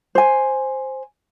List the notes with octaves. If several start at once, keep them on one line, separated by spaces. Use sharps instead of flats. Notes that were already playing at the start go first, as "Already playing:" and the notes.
C5 G#5